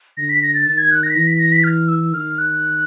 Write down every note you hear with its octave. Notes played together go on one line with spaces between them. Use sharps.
D3 A#6
B6
A#6
A6
D#3 A6
G#6
F#6
A#6
B6
E3 A#6
B6
A#6
B6
F6
E6
D#3 F6
F#6